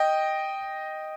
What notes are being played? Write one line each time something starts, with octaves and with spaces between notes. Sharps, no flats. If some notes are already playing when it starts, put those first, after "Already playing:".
Already playing: D#5 G5